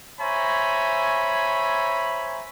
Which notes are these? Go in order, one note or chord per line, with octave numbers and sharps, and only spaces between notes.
C5 C#5 E5 G#5 A#5 B5